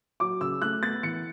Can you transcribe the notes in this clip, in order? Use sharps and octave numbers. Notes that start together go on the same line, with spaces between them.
F#3 D6
C#3 E6
A3 F#6
B3 A6
E3 C#7